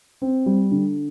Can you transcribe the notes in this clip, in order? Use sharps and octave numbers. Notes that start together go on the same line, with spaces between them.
C4
G3
D3